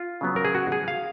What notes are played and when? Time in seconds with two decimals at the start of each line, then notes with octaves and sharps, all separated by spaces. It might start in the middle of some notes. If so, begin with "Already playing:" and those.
Already playing: F4
0.21 C#3 F#3 B3
0.36 A#4
0.45 G#4
0.55 F#4
0.72 G#4
0.88 F5